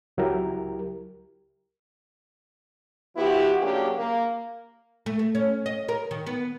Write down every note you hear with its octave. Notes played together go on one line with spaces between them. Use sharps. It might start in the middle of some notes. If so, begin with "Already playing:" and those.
C#2 F#3 E4 G4 A#4
F3 B3 E4 F#4 G4
C#3 F#3 A#3 D4 G4 G#4
A#3
A3
A3
C#4
D#5
A#4
D#3
B3